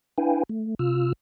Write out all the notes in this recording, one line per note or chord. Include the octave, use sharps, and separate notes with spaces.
D4 E4 B4 F5 G5 G#5
A3
C3 F4 E6 F6